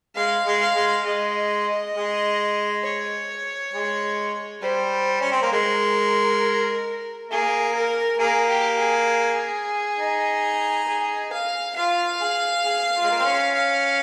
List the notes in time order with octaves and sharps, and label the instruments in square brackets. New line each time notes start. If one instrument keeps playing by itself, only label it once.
[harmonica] G#3 [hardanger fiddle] F5
[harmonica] G#3
[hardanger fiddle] F5
[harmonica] G#3
[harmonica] G#3 [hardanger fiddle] D#5
[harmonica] G#3
[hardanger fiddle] C#5
[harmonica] G#3
[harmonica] G3 [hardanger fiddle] C5
[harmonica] C#4
C4
A#3
[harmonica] G#3 [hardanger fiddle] A#4
[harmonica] A#3 [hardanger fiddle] G#4
[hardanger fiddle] A#4
[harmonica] A#3 [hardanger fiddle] G#4
[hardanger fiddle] G4
G#4
[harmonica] D#4
[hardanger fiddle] G#4
F5
[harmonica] F4 [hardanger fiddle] F5
[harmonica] G#4
G#4
F4
G#3
A#3
C4
C#4
[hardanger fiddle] F5